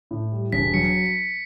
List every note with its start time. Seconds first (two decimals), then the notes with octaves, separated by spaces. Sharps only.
0.11 A2
0.32 G3
0.52 E1 B6
0.74 F#3 C#7